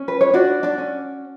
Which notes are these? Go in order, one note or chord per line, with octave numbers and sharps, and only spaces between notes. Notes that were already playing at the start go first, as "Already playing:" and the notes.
Already playing: C#4
B4
C#5
D4 F#4 D5
D4 D5
C#4